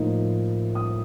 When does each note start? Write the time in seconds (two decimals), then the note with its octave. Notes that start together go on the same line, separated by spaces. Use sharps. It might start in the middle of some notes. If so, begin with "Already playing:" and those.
Already playing: A2 F3 A#3 D#4
0.75 D#6